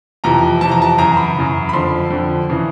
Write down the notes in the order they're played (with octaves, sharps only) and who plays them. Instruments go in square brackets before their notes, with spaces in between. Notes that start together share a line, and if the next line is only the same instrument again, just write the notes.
[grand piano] F2 C3 E3 A#5
F2 C3 E3 A5
A#5
A5
F#2 C#3 E3 A#5
B5
F#2 C#3 E3
B5
F2 D3 C6
F2 D3
C#3 E3